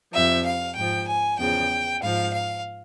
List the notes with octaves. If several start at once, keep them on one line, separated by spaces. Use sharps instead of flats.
F2 C3 F3 E5
F5
G#2 F3 G5
G#5
E2 C#3 F3 G5
G#2 F3 F5
F5